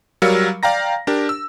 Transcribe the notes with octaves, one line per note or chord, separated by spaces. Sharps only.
F#3 G3 A#4 F5 E6 C#7
D5 F5 G5 A#5 A#6
D4 G4 A#4
E6